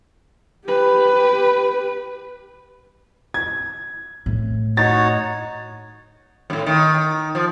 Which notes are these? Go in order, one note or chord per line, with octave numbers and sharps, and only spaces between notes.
G4 B4
G#6
A2
D#4 F#4 C#5 A6
F2 A2
D#3
F3